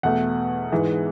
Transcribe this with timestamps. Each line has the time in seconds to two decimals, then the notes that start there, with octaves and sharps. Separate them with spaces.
0.03 E2 B2 A3 F#5
0.72 G#2 E3 G#3